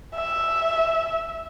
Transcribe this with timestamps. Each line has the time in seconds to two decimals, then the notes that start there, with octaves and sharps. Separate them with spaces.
0.15 E5